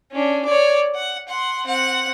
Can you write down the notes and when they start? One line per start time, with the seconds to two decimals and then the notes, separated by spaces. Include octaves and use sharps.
0.12 C#4 D4
0.45 C#5 D5
0.95 F#5
1.29 F#5 C6
1.66 C4 F#5